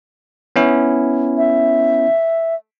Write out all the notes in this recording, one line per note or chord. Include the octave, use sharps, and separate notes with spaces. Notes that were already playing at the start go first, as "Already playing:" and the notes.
B3 C#4 E4
E5